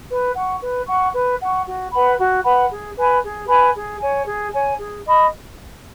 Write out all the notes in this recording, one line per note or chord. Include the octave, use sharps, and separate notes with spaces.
B4
F#5 C#6
B4
F#5 C#6
B4
F#5 C#6
F#4
B4 F#5 B5
F#4
B4 F#5 B5
G#4
B4 G#5 B5
G#4
B4 G#5 B5
G#4
C#5 G#5
G#4
C#5 G#5
G#4
D#5 B5